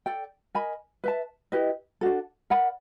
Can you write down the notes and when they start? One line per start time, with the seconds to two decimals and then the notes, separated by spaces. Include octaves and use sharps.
0.06 A4 D5 G5
0.55 A#4 D#5 G#5 B5
1.04 B4 E5 A5
1.52 E4 G4 B4 D#5
2.01 D4 F#4 A4
2.50 A#4 D5 F#5 B5